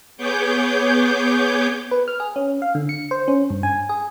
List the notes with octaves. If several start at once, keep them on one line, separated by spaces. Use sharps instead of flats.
B3 G#4 C#5 D6 G6
B4
F6
G#4
C#4
F5
D3
C#7
C5
C#4
G2
G#5
G#4